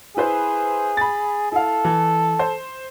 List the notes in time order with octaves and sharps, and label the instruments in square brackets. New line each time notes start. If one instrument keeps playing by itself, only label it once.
[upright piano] E4 B4 C5 [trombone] G#4
[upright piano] B5 A6
[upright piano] E4 F5 [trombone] A4
[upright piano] E3
C5